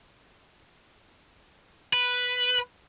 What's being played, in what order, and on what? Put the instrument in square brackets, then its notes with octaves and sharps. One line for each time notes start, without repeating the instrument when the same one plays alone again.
[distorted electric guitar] B4